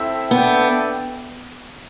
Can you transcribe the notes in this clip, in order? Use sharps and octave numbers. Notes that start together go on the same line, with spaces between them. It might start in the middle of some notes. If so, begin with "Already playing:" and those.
Already playing: C4 E4 A4 E5 G5
B3 D4 A4 E5 G5